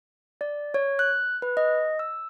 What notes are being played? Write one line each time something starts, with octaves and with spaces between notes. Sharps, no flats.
D5
C#5
F#6
B4
D#5
E6